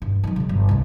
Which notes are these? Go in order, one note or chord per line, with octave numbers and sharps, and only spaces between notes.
G2
D#3 F#3
C#3 F#3
G1
C2 A2